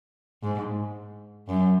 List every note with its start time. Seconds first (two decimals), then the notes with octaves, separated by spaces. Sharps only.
0.43 G#2
1.48 F#2